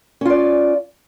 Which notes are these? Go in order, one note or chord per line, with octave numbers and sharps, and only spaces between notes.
C#4 F4 D5